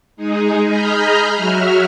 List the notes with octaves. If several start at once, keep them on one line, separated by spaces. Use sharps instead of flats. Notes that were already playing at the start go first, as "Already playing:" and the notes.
G#3 D#4 G#4
G#4 D#5 A#5 B5 F6 G6
F#3 F#4 E5 F6